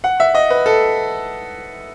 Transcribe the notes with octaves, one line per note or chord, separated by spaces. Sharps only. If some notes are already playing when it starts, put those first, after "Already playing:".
F#5
E5
D#5
B4
A4